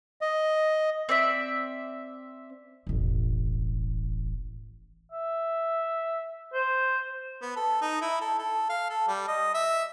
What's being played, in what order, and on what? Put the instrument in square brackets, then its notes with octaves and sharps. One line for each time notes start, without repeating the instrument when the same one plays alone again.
[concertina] D#5
[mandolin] C4 D5 E5
[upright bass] E1 A1
[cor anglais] E5
C5
[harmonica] B3
A4
D#4
E4
A4
A4
F5
A4
G3
D#5
E5